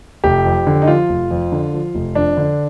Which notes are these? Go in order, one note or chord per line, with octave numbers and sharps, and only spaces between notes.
F1 G4
F2
D3
D#4
F3 F4
F1
F2
D3
F3
F1
F2 D4
D3